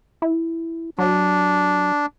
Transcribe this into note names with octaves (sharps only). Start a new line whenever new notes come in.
E4
F#3 D4